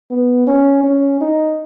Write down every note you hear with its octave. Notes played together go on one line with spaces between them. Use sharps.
B3
C#4
C#4
D#4